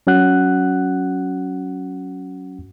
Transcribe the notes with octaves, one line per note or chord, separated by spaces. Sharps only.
F#3 C#4 F#4 F#5 F#6